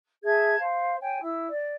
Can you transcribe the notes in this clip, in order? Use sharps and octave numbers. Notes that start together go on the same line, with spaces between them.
G#4 E5 A5 G#6
C5 F5
C#5 G5 G#5
E4 E6
D5